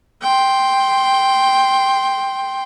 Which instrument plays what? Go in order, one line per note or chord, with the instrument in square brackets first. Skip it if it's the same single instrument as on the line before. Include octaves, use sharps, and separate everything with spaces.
[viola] G5 C6